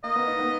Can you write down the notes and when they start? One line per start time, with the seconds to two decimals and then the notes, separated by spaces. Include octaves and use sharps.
0.04 A#3 D#5
0.16 B3
0.27 D#4
0.39 B3